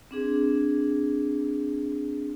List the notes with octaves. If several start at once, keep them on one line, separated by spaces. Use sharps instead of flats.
C4 D4 G#4